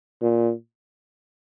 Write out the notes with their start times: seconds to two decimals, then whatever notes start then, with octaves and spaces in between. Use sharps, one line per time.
0.22 A#2